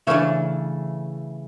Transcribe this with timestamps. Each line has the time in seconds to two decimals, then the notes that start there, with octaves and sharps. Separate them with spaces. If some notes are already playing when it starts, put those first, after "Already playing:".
0.07 C#3 E3 A3 D4 C#5 E5